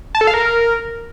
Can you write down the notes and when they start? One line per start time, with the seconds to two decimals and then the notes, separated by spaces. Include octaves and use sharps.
0.15 A5
0.21 A4
0.27 F5
0.34 A#4